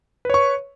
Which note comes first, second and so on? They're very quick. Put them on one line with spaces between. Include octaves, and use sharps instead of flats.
B4 C#5 C#6